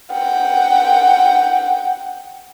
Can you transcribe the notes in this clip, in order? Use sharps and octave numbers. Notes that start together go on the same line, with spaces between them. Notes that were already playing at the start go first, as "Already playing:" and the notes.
F#5 G5